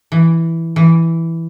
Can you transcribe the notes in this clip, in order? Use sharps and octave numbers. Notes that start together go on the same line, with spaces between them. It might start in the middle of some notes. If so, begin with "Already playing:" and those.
E3
E3